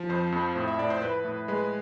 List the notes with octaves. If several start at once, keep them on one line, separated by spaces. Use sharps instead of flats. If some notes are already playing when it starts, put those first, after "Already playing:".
Already playing: F3
F2 C5
F2
A2 C5
E5
A2 D5
C5
A2 B4
A2
G#3 B4